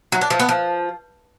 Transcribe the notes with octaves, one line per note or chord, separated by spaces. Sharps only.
F#3
D4
F3
B3
F3